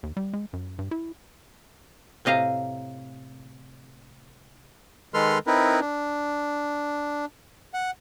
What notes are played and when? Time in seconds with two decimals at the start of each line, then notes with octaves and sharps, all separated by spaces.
0.03 D#2
0.17 G3
0.33 G#3
0.53 F#2
0.79 G2
0.91 E4
2.25 A2 C3 D#5 F5 A#5
5.14 D#3 G#3 A4 B4 C6 F6
5.47 C4 D#4 E4 A#4 B4
5.81 D4
7.74 F#5